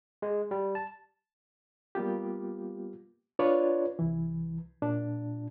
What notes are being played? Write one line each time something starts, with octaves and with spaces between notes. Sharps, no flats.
G#3
G3
A5
G3 A#3 B3 F4 G4
D4 F4 B4 C#5 D5
C2 E3
A#2 D4